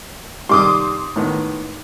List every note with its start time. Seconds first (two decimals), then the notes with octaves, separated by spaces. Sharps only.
0.49 C3 D#3 G3 C6 D6 D#6
1.16 A2 D#3 B3